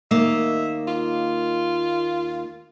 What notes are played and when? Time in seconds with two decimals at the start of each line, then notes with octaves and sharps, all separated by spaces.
0.11 D#2 A#3 D#5 E5
0.87 F4